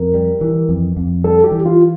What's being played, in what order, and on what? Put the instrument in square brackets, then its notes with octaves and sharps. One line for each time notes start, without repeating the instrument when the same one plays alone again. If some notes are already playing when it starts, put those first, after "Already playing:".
Already playing: [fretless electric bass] F2 [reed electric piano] A#4
[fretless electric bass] G3
E3
F2
F2
[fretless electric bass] G3 [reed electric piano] A4
[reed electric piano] G4
[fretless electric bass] E3
[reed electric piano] F4